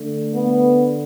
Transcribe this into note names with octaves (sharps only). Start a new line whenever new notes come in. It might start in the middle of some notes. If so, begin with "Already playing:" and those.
Already playing: D3 A3
B3